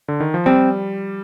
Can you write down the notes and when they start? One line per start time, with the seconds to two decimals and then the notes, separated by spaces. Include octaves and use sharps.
0.08 D3
0.20 D#3
0.34 F3
0.46 G3 C4